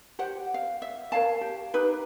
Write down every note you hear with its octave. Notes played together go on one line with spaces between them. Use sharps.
G4 C5 F#5
F5
E5
A#4 C#5 F5 A5
G4
D#4 G4 B4